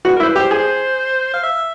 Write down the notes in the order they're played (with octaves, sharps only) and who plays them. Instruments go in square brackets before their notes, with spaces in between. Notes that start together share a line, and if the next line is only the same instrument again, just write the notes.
[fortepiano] F#4 [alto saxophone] B4
[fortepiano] E4 [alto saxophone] A#4
[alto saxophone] C5
B4
[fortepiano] G4
[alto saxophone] C5
[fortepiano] G#4
[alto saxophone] F5
E5